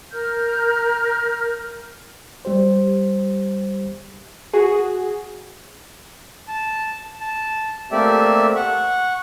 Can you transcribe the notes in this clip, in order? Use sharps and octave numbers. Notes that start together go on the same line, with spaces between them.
A#4 F6 G6
G3 G4 C5
F#4 G#4
A5
A5
A3 A#3 C4 G4 D5 E5
F#5 C#6